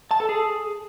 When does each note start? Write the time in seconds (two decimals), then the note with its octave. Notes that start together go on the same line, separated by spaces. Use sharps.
0.11 A5
0.20 A4
0.29 G#4